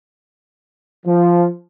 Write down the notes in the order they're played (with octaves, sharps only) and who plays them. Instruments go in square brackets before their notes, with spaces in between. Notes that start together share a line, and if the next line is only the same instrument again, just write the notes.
[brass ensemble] F3